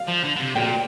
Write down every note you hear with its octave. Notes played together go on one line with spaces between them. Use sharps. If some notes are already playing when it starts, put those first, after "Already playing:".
Already playing: F5
F3
D3
D3
C3
A#2 G5